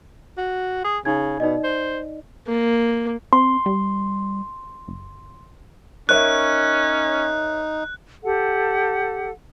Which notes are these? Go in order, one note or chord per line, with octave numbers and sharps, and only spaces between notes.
F#4
G#4
C#3 D#4 G#5 G#6
B2 D#4 D5 D#5
C5
A#3
C4 C6
G3
F#1
C#4 D#4 A#4 C#5 E5 F#6
G4 A4 F#5